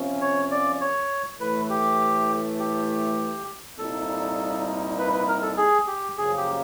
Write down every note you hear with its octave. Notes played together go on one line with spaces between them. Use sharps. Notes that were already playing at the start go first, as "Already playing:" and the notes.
Already playing: C3 F3 A#3 C#4
C#5
D5
C#5
A2 E3 A3 B4
G4
G4
C2 A#2 G3 A#3 D#4 A4
B4
B4
A#4
A4
G#4
G4
F#2 C#3 F3 A#3 G#4
G4